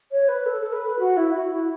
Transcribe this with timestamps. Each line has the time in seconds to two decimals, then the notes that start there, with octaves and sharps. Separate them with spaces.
0.11 C#5
0.28 B4
0.46 A4
0.61 A4
0.73 B4
0.99 F#4
1.17 E4
1.34 F#4
1.52 E4